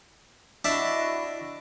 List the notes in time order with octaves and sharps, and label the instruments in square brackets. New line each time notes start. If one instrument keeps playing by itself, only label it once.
[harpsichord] D4 E5 [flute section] E4 F#4 D#5